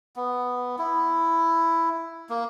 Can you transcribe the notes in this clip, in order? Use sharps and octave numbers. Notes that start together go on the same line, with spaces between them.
B3
E4
A#3